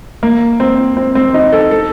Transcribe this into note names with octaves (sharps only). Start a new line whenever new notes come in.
A#3
C4
C4
C4
D#4
A4
A4